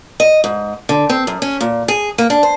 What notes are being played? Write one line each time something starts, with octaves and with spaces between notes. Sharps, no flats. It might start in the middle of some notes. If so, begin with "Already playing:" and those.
D#5
G#2
D3
C4
F#2
C#4
A#2
G#4
A#3
D4
C5